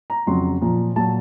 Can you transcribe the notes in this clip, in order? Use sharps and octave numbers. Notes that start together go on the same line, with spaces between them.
A#5
F2 C#3 F#3 C6
A#2 F3 A#5
A#2 F#3 A5